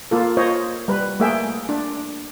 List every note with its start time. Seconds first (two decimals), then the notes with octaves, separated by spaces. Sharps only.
0.11 A#3 F4 A4
0.37 F4 C5 C#5 D#5
0.88 G3 B4
1.20 A3 A#3 G#4 E5 G5
1.69 D4